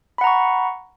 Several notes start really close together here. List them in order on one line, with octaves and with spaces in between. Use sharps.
B5 F#5 A#5 C#6